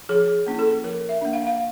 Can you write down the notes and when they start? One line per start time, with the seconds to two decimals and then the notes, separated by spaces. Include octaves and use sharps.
0.09 F3 G#4
0.46 A#3 C#4 E4
0.59 A4
0.83 F3 A#4
1.09 E5
1.21 A#3 D4
1.33 F5
1.47 F5